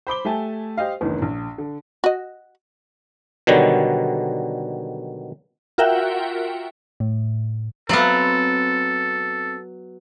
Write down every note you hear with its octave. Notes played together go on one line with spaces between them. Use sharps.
C5 B5 D6 G7
A3 G4 E5 G#5 A5
G4 C5 D#5 F5
F#1 D2 D#3 E3 B3
A#1
D3
F#4 D#5
B2 D3 D#3 F#3 G3
F4 F#4 A#4 E5 F#5 G5
A2
F#3 B3 C4 A4 F5